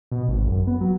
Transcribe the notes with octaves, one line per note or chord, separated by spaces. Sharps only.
B2
G#1
F#2
B3
F#3